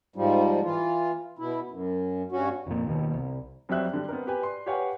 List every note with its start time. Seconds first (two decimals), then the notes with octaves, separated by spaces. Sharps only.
0.16 G#2 F3 G3
0.64 E3 F4
1.39 B2 E4
1.71 F#2
2.32 G2 C#4 F#4
2.66 F1 F2 A#2
2.87 D#2 B2
3.13 C2
3.69 F2 F#3 G3 C4 E5 F#6
3.93 D3 G3
4.09 B3 C4 A#4
4.27 G4 B4 G#5
4.41 D5 C6
4.66 G4 B4 C#5 F5 F#5 G#5